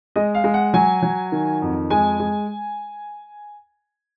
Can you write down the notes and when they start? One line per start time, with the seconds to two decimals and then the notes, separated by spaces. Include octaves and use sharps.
0.16 G#3 D#5
0.35 F5
0.44 G#3
0.54 F#5
0.74 F#3 G#5
1.02 F#3
1.32 D#3
1.62 F2
1.90 G#3 G#5
2.20 G#3